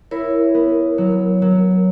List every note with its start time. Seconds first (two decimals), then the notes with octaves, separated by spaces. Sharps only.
0.11 E4 A#4 C#5
0.54 B3
0.98 F#3
1.42 F#3